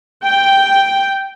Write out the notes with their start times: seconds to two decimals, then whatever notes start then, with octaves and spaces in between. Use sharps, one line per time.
0.25 G5